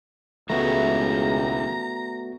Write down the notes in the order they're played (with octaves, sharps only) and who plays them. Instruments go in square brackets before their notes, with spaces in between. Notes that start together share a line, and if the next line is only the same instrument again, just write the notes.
[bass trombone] C#2 [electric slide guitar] E3 G#3 E4 [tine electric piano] A3 B3 F#4 [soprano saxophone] A#5